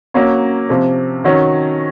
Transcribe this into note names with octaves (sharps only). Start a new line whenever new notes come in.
F#3 A#3 C#4
C3 F3 C4
D#3 F#3 C#4